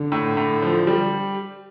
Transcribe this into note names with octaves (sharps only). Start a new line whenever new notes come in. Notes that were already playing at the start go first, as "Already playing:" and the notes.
Already playing: D3
A2
A2
F3
G3